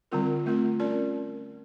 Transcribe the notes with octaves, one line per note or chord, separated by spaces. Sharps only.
D3 G3 C4 F4 A#4
A3 C4 F4
C#4 F4 A#4 D5